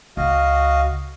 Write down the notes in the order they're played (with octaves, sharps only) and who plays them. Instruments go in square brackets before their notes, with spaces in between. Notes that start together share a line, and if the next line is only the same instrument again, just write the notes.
[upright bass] C#2 [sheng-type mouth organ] F#4 D#5 F5